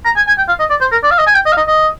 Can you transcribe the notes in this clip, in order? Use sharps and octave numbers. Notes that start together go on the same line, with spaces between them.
A#5
G#5
G#5
G5
F5
D#5
D5
C5
A#4
D5
F5
D#5
G#5
G5
D#5
F5
D#5
D#5